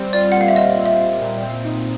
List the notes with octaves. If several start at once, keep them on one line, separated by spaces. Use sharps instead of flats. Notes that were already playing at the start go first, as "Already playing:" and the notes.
Already playing: G3 C4
F4 D5
F#5
A#2
F5
E5
G3 D#5
C4
E5
F4
A#2
C4
D#4